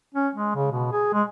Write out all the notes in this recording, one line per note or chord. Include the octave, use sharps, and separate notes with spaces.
C#4
G#3
C#3
B2
G#4
G#3